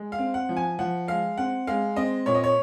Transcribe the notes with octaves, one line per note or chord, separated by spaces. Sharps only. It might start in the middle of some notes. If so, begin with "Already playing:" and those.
Already playing: G#3
F5
C4
F#5
F3
G#5
F3 F#5
G#3 F5
C4 F#5
G#3 F5
C4 D#5
A#2 C#5
D#5
C#5